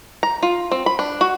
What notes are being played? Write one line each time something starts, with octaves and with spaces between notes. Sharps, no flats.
A#5
F4
C4
B5
D4
F#4